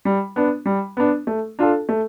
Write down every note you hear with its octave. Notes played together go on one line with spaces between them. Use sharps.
G3
B3 D4
G3
B3 D4
A3
D4 F4 A4
A3